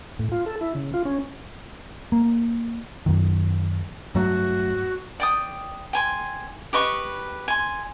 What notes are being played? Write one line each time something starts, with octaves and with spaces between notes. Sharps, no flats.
A2
F4
A4
E4
C#3
F4
C#4
A#3
F#2 D#3
G2 F#3 A3 F#4
D5 G5 D#6
G5 G#5 C6
G4 B4 D#5 C#6
G#5 C6